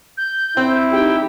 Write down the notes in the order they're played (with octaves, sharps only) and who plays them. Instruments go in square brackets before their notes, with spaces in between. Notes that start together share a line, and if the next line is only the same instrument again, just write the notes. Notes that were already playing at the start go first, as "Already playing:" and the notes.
[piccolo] G6
[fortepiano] C4 [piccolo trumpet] E4
[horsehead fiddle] D#4 G4 [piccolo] G5